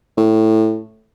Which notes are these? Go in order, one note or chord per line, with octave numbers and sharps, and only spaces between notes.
A2